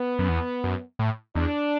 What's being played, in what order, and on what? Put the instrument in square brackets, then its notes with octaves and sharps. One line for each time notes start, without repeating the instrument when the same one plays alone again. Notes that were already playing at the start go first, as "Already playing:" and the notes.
Already playing: [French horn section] B3
[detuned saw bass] F#2
E2
F#2
A2
[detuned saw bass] E2 [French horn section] D4